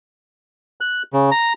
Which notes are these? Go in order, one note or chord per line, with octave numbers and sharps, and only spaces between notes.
F#6
C#3
A#5